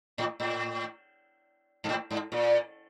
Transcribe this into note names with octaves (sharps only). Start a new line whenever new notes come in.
A2
A2
G#2
A2
G#2
A#2